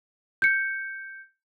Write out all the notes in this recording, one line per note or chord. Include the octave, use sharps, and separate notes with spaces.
G6 C#7